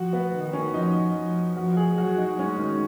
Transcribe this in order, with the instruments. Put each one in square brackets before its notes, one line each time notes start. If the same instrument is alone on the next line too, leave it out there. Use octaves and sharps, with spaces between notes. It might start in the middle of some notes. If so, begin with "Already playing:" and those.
Already playing: [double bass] F3 [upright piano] F#4
[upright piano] B3
[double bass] D#3
[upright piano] C#4
[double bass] F3 [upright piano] D#4
[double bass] F3
[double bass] F3 [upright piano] F#4
[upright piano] G#4
[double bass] F#3 [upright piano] F#4
[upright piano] D#4
[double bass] G#3 [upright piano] C#4
[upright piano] D#3